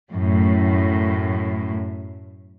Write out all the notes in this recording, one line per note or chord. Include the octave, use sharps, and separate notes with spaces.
F#2 A2